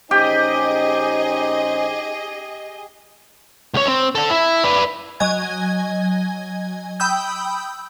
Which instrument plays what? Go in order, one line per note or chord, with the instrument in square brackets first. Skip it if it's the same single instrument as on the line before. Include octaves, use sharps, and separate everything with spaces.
[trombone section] A#1 C#4 C5 [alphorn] D#4 [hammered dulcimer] G4 [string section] G#4 D#5
[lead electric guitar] C#2 C#5
C4
D3 A4
E4
B4 D5
[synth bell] F#3 D#5 G#5 G#6
G5 B5 D#6 E6 G6